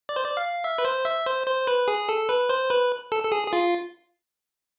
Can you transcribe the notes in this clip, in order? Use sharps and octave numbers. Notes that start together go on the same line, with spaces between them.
D5
C5
D5
F5
E5
B4
C5
E5
C5
C5
B4
G#4
A4
B4
C5
B4
A4
A4
G#4
G#4
F4